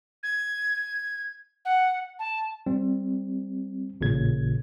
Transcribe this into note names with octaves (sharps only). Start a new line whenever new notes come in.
G#6
F#5
A5
G3 C4
A1 A#2 C#3 G#6